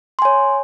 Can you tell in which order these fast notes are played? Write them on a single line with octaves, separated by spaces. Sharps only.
C6 G#5 C#5